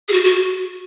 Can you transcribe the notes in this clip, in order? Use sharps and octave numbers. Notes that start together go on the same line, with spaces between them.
G#4
F#4
F#4